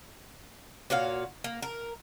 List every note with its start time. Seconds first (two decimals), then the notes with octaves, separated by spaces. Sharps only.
0.90 A#2 F#4 C#5 F5
1.44 A#3
1.62 A#4